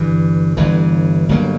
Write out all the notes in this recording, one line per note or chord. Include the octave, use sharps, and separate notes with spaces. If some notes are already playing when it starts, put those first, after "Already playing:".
Already playing: G1 G2 E3
G1 G2 E3
G1 G2 F#3 A#3